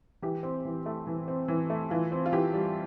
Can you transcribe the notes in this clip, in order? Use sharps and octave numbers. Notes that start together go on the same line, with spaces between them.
E3 G4
C4
E3
A3
E3
C4
E3
A3
E3 F4
C4
F4
E3 G4
G3